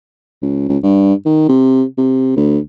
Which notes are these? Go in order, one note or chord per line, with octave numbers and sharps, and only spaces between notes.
C#2
C#2
G2
D#3
C3
C3
D2